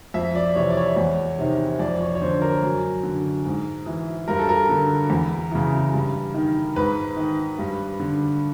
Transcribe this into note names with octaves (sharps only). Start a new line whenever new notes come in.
F2 E5
D5
C3 E3 C#5
D5
C#5
E2
C3 D#3
F2 D5
C#5
C#5
D3 C5
A#4
F#2
D3
G#2
E3
G2 A#4
A4
A#4
D3
E2
C#3 E3
G2
D#3
G#2 B4
D#3
G2
D3